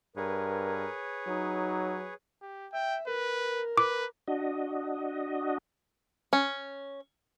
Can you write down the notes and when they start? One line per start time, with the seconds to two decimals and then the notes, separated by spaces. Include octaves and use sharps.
0.16 G2 G#4 A#4 B4 C#5
1.27 F#3 D#4
2.42 G4
2.73 E5 G5
3.07 A#4 B4
3.78 B4 D6
4.28 D4 F#4 D#5
6.33 C#4